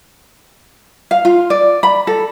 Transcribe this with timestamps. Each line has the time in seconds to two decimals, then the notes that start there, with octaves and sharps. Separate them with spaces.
1.11 F5
1.25 F4
1.50 D5
1.83 B5
2.07 A4